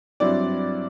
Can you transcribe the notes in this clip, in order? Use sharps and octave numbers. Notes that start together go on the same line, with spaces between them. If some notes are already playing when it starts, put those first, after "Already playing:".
G2 F#3 C4 E4 D5